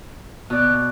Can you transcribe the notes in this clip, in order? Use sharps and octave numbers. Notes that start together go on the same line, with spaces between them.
B2 D5 F#6